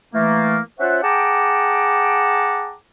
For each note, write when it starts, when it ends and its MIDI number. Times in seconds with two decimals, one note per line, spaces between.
0.14 0.59 52
0.14 0.59 57
0.14 0.59 58
0.80 1.02 61
0.80 1.02 65
0.80 1.02 72
0.80 1.02 76
0.80 1.02 78
1.04 2.74 68
1.04 2.74 78
1.04 2.74 79
1.04 2.74 81
1.04 2.74 82
1.04 2.74 86